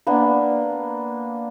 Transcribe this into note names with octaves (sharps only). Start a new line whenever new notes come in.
A#3 B3 D4